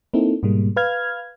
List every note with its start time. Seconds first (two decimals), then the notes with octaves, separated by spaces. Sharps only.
0.14 A#3 C4 D#4 E4 A4
0.43 G#2 B2 G3 G#3 A#3
0.76 B4 F5 F6 G#6